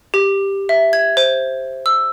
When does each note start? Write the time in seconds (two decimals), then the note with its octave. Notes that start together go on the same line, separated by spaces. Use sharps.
0.14 G4
0.69 E5
0.93 G#6
1.17 C5
1.86 E6